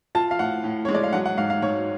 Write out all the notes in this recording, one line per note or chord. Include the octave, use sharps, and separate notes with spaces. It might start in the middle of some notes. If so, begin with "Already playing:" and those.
F4 A5
F5
A2 F#5
A2
G#3 C#5
D5
F5
F#3 F#5
F#5
G#2 F5
F5
G#2 C#5